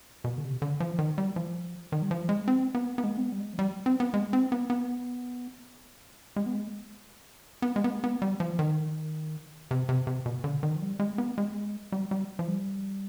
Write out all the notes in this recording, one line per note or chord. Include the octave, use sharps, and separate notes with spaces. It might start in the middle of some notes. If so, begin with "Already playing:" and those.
B2
D3
C3
D3
F3
D#3
G3
F3
D#3
G3
F3
G#3
C4
B3
B3
G#3
C4
B3
G3
G#3
F3
G3
C4
B3
G#3
C4
B3
B3
G#3
B3
G#3
B3
G#3
B3
G#3
B3
G3
F3
D#3
C3
C3
C3
B2
D3
D#3
F3
G3
G#3
B3
G#3
G3
G3
F3
G3